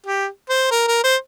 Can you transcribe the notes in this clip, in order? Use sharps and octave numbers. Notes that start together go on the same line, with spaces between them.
G4
C5
A#4
A#4
C5